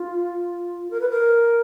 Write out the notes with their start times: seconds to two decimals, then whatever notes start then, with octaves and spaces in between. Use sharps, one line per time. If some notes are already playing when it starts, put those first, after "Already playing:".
Already playing: F4
0.91 A#4
1.01 B4
1.10 A#4